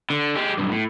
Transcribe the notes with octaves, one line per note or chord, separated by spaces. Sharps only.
D3
G#3 G4
B1 G2
A2